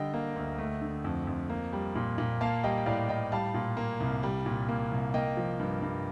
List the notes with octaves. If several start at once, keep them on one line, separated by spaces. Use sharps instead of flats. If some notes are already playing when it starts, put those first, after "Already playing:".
Already playing: D3 G3 D#5 G5
A#3
D2
A3
D3
F2
F2
A#3
G3
A#2
A#2
A#3 F5 A5
G3 D#5 G5
G5
A2 D5 F5
A2 D#5 G5
G3 F5 A5
A#2
A#3
C2
G3
A#2
A#3
C2
A#3 D#5 G5
F3
G2
G2